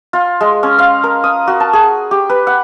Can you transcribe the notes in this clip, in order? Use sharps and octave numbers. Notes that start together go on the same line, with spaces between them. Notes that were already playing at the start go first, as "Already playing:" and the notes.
F4
G#3
C#4
F5
A#4
D#6
F#4
A5
G#4
G4
B4
F#5